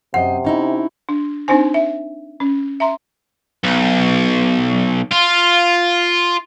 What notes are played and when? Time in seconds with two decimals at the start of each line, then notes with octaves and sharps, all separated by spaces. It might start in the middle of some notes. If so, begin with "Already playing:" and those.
0.14 F#2 C3 C5 D#5 F#5
0.45 C#4 D#4 E4
1.09 D4
1.48 C4 D4 D#4 C5 G#5
1.74 E5
2.40 C#4
2.80 E5 A#5 C6
3.63 B1
5.12 F4